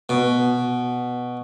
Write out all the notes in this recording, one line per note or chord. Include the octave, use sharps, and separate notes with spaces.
B2